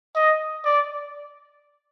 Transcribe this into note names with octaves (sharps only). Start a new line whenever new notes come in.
D#5
D5